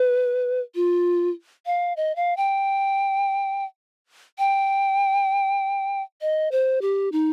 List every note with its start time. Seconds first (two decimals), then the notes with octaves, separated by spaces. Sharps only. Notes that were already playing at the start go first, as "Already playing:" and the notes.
Already playing: B4
0.75 F4
1.66 F5
1.97 D#5
2.16 F5
2.37 G5
4.39 G5
6.21 D#5
6.52 C5
6.82 G4
7.12 D#4